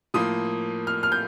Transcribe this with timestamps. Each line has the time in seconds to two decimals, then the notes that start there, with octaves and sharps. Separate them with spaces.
0.14 A2 F3 A#3 D#6
0.87 F6
1.03 F6
1.12 G6